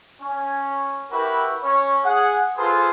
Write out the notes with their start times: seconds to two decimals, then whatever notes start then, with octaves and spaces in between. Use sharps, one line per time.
0.22 C#4
1.11 E4 F#4 G4 A#4 B4
1.64 C#4 C#5
2.04 G#4 F#5
2.57 F4 G#4 A4 B4 C5